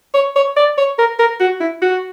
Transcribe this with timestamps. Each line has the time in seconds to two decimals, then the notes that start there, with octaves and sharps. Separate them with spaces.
0.14 C#5
0.36 C#5
0.57 D5
0.78 C#5
0.99 A#4
1.19 A#4
1.40 F#4
1.60 E4
1.82 F#4